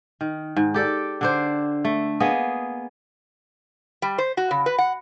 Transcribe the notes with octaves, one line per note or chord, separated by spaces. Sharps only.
D#3
G#2
G4 A4 D5 G5
D3 D4 C5
A3
A#3 B3 G#4 D#5
G3
C5
F#4
C#3
B4
F#5